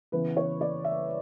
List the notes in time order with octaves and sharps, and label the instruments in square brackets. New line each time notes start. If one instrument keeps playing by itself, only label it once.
[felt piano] C#3 E3 B3 B4
C#5
D5
E5